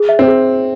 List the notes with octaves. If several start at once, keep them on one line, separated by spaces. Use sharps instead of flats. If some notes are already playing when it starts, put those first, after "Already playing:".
Already playing: G#4
E5
C4
G#4